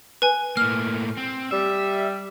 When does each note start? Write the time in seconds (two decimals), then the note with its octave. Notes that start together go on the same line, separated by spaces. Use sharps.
0.22 B4 G#5
0.57 A2 A#3 F6
1.17 C4
1.51 G3 E5